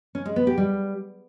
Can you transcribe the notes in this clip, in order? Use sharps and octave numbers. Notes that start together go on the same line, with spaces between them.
C#4
G#3
B3
G4
G3